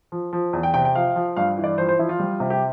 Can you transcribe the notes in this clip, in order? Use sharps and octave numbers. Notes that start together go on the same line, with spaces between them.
F3
F3
E2
G5
C3 G5
G5
F3 F5
F3
G2 F5
E3
D5
F3 C5
C5
F3 E4
F4
G3
C3
G4